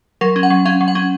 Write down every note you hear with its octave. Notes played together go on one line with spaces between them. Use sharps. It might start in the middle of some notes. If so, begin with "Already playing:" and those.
F#3 A#4
C#4
F#5
F#3
C#4 F5
F#3
F#5
C#4